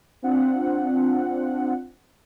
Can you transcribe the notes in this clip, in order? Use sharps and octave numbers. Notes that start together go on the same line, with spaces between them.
C4 D4 F4 F#5